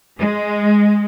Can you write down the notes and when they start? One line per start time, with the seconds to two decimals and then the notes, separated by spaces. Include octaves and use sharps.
0.19 G#3